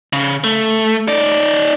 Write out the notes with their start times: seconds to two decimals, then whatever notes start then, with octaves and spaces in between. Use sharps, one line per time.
0.13 C#3
0.44 A3
1.08 D#4 D5